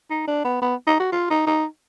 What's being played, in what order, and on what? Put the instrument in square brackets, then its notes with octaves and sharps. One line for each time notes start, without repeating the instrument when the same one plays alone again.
[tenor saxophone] D#4
D4
B3
B3
D#4
F#4
F4
D#4
D#4